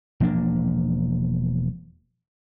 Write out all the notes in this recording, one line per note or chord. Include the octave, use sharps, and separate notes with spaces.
E1 F3 A#3 D4